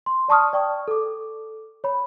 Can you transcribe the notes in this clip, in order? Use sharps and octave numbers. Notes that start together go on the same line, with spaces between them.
C6
D5 A5 C#6 D#6 F6
D5 G5 C#6
A4 D6
C#5 B5